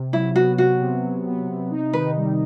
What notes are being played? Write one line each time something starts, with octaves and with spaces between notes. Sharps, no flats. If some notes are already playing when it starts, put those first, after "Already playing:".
Already playing: C3
F#3 E4
B3 F#4
C3 F#4
C3
F#3
B3
C3
D#4
D#3 B4
G3